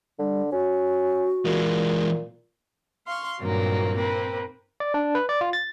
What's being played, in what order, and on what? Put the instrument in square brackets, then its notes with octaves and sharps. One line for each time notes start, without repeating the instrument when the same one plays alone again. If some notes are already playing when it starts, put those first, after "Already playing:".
[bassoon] D3 [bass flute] G3
[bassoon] C#4 [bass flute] F#4
[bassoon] A#2 [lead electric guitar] E3 G#3
[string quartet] F5 C6 C#6
G2 A#2 D#3 F#3 A#3 C4
A#3 C4 B4
[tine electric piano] D5
D4
B4
D5
F4
A6